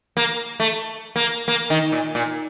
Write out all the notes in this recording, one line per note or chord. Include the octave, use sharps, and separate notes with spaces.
A#3
A3
A#3
A#3
D#3
A#2
A#2